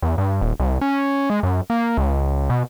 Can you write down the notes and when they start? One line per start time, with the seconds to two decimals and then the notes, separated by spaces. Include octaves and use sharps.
0.02 E2
0.18 G2
0.41 D#1
0.60 C2
0.81 C#4
1.30 G#3
1.43 F#2
1.70 A#3
1.97 C#2
2.50 B2